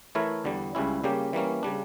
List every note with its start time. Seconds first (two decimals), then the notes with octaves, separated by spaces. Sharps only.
0.15 E3 A3 E4 A#4 C#5
0.44 E2 D3 G3
0.75 C#2 C#3 G3 C#4 E4
1.04 C#3 G3 A#3 C#4 G4
1.33 E3 G3 A#3 C#4
1.63 C#3 G3 D4